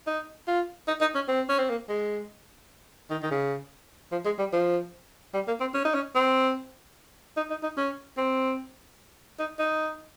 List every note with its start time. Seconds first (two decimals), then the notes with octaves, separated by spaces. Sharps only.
0.07 D#4
0.48 F4
0.88 D#4
1.01 D#4
1.15 C#4
1.28 C4
1.49 C#4
1.59 C4
1.69 A#3
1.89 G#3
3.11 D#3
3.22 D#3
3.31 C#3
4.12 F3
4.25 G#3
4.39 G3
4.53 F3
5.34 G3
5.48 A#3
5.60 C4
5.74 C#4
5.85 D#4
5.94 C#4
6.15 C4
7.37 D#4
7.50 D#4
7.63 D#4
7.77 C#4
8.18 C4
9.39 D#4
9.59 D#4